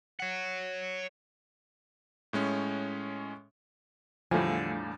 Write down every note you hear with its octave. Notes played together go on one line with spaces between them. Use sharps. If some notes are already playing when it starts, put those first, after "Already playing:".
C#5 F#5
A2 G#3 C#4
E2 A2 D3 F3 G3 A3 F5 G#5